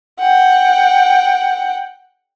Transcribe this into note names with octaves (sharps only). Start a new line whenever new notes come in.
F#5 G5